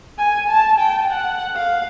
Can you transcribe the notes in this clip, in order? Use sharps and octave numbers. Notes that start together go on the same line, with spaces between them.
G#5
A5
G5
F#5
F5